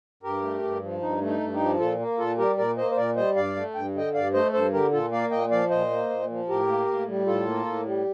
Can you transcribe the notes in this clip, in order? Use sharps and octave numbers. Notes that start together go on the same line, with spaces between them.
G2 G4 A#4
A3
G2
F3
G2 D#4
A3
D#4
G2
D#4 G4
F3
A#2 F4 A4
A#3
A#2 F4 A4
G3 G4 A#4
A#2 A#4 D5
A#3 C5 D#5
C5
A#2 A#4 D5
G3 C5 D#5
G2 D5 F5
A3
G2 G5
D3 D#5 G5
G2 D5 F5
A3 C5 D#5
G2 A4 C5
D3 G4 A#4
A#2 F4 A4
A#3 D5 F5
A#2 D#5 G5
F3 D5 F5
A#2 C5 D#5
A#3
A#2
F3
A2 G4 A#4
A#3
A2
G3
A2 F4 A4
A#3
A2
G3